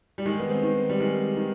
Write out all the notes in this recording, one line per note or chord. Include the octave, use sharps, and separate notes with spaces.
G3
D#3 G#3
B3
C4
D#3
G3
D#3 G#3
D#3